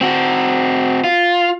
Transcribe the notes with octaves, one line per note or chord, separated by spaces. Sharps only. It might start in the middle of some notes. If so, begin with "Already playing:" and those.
C4 F#4
F4